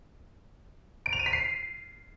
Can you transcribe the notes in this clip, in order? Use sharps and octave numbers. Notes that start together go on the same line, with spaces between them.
D7
F7
D#7
B6
C7